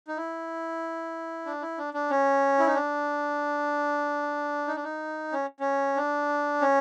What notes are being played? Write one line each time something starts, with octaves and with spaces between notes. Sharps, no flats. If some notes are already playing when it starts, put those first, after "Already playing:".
D#4
E4
D4
E4
D4
D4
C#4
E4
D#4
D4
D#4
D4
D#4
C#4
C#4
D4
C#4